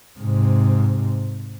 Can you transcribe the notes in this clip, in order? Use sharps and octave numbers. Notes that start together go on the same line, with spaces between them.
G#2 C3